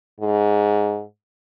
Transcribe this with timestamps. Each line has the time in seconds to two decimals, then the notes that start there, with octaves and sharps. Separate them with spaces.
0.20 G#2